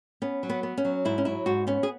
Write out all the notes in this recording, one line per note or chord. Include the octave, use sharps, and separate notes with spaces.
B3 C#4
F#3
B3
B3
C#4
F#3
G#2 E4
C#4
F#3 E4
G#2 F#4
B3 C#4
G#4